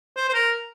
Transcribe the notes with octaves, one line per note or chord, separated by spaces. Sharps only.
C5
C5
A#4